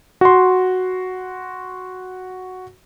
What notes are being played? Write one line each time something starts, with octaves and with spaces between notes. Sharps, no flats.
F#4 C6